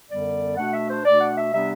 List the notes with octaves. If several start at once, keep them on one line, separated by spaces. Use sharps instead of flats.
F#2 D3 G3 B3 D5
B2 A3 D4 F#5
E5
C5
B2 A3 D4 D5
F#5
E5
C3 G3 B3 D4 E5